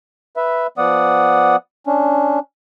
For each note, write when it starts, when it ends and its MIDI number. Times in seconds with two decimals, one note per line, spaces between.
0.37 0.67 71
0.37 0.67 76
0.78 1.56 53
0.78 1.56 59
0.78 1.56 74
0.78 1.56 78
0.78 1.56 87
1.87 2.39 61
1.87 2.39 62